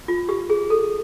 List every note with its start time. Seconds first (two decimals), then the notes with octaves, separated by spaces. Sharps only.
0.08 F4
0.29 G4
0.50 G#4
0.70 A4